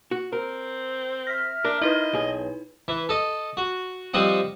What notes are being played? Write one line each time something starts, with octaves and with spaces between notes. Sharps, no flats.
F#4
C4 A#4
E5 F6 A#6 B6
D4 A#4
D#4 E4 B4 D#5
B1 G#4
E3
A4 D#5
F#4
F3 G3 C4 D#5 F#5